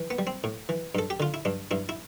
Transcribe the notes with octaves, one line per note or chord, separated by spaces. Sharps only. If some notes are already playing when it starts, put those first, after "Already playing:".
Already playing: E3
B3
G3
C4
A2
E3
G2 A4
G4
D3 F4
E4
G2 D4
G2 E4
E4